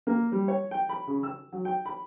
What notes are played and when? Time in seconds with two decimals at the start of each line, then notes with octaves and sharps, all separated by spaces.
0.07 A#3
0.32 G3
0.48 C#5
0.71 G5
0.89 B5
1.07 C#3
1.23 E6
1.52 F#3
1.65 G5
1.85 B5